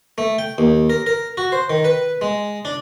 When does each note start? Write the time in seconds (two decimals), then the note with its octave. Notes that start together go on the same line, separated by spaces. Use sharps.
0.18 A3
0.38 G5
0.58 D#2
0.90 A#4
1.06 A#4
1.37 F#4
1.52 C5
1.70 D#3
1.84 B4
2.21 G#3
2.65 D4